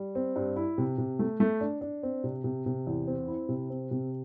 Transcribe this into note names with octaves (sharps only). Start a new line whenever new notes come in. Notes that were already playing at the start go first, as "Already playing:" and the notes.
Already playing: G3
C4
G2
E4
C3
C3
A3
A3
D4
D4
C4
C3
C3
C3
E2
C4
E4
C3
C4
C3